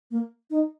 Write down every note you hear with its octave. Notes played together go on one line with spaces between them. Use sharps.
A#3
D#4